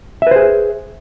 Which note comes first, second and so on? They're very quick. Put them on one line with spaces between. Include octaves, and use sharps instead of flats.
E5 B4 C5 G#4